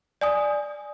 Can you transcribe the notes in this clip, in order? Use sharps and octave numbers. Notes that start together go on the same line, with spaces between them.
D5 G#5 D#6